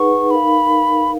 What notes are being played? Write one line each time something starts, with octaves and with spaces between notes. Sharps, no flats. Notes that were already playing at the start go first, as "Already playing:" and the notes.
Already playing: D#4 G#4 B4 F#5 C#6
D#4 A#4 F5 B5